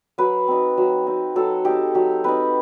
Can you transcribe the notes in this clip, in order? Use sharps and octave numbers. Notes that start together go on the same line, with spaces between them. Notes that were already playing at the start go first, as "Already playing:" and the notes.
F#3 B4
C4 D#4
F#3
C4 D#4
F#3 A4
C4 D#4 G4
F#3 G4
C4 D#4 B4